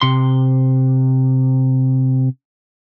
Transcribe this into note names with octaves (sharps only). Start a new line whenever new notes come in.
C3 C6